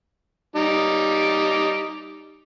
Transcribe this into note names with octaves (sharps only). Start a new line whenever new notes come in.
G3 D#4 D6